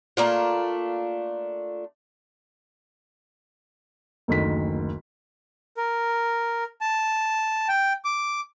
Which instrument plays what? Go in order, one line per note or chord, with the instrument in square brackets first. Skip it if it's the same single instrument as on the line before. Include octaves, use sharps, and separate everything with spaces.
[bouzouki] A3 A#3 D4 F4
[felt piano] F#1 D2 D#3 B6
[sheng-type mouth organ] A#4
A5
G5
D6